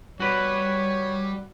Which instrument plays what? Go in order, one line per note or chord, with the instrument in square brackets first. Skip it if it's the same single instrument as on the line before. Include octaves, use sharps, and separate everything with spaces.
[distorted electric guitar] G3 [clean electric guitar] F#4 B4 [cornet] C#5